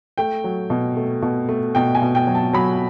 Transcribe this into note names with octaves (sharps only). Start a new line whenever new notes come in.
A3 G5
F#3
B2
A3
B2
A3
B2 G5
G#5
B2
G5
F#3
A5
F#3 B5